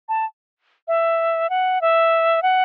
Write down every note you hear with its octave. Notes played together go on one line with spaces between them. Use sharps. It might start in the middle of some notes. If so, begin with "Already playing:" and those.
A5
E5
F#5
E5
F#5